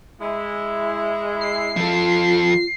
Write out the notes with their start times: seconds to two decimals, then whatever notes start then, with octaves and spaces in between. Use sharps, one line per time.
0.21 G#3 E4
1.41 C7
1.77 F3 F4 A4